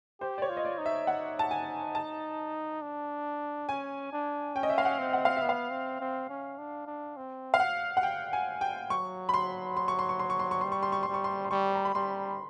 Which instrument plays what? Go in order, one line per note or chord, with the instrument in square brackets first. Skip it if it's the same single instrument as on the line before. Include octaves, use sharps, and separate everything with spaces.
[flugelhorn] G4 [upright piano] C5
[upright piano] D5
C#5
[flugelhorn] F4
[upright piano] D#5
D5
[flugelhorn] D#4
[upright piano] E5
F#5
A5
G#5
A5
[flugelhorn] D4
[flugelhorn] C#4 [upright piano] G#5
[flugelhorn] D4
[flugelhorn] C#4 [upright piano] G5
[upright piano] D#5
E5
F5
F#5
[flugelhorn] C4
[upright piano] F#5
F5
E5
[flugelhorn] B3
[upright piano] F5
[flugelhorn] C4
C4
C#4
D4
D4
C4
[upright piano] F5
F#5
F#5
G5
G#5
G5
[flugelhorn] F#3 [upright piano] C#6
[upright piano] B5
C6
C6
C#6
C6
C#6
C6
C#6
C6
C#6
[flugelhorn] G3 [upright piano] C6
[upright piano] C#6
C6
C#6
C6
[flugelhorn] G3
[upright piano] C#6
C6
C6
[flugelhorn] G3 [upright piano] C#6
[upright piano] A#5
B5
[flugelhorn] G3 [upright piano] C6